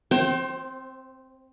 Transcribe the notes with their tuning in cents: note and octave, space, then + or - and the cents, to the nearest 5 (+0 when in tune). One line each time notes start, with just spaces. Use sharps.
C4 +0 C5 +30 G5 -25